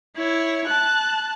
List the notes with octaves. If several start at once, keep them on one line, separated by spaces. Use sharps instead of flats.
E4 C#5
A5 F#6